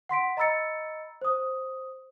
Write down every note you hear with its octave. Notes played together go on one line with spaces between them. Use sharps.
F#5 C6 B6 D7
D#5 A#5 B5 E6 A6 C#7
C5 D#6